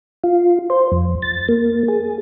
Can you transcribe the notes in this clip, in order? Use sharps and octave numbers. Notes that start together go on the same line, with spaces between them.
F4
C5
F2
A6
A#3
G#4